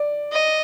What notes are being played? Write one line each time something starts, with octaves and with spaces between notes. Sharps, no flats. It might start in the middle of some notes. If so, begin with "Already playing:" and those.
Already playing: D5
D#5